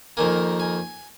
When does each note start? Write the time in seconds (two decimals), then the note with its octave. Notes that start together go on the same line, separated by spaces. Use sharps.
0.17 F2 D#3 A#3 G#5
0.60 G#5